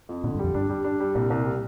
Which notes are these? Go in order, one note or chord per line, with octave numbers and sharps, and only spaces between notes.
F2
A#2 D3
G2
F2 G3
G2 D4
G3
D4
G3
C2 A#2
C2
G3